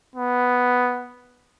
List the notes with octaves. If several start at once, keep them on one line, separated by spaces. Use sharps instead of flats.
B3